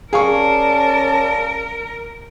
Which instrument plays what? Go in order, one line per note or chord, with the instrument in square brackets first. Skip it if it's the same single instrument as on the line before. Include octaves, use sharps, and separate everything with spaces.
[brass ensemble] C#4 D5 A5 [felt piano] G#4 F5 C#6 [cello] A#4